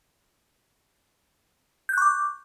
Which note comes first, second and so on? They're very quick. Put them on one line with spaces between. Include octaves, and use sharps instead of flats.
G6 F#6 C#6 D6